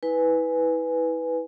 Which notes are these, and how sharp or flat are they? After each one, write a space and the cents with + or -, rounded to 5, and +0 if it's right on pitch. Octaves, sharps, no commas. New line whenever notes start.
E4 -30 B4 +0 G#5 +0